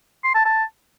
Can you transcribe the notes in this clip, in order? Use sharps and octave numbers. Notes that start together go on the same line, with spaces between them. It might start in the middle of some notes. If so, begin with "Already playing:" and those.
C6
A5
A5